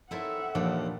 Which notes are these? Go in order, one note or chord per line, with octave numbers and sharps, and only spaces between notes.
C4 D#4 E4 A4 A#4 C#5 E5 F#5
D#2 A#2 E3 F3 D4